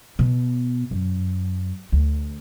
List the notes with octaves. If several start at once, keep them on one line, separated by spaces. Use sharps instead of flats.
B2
F#2
D2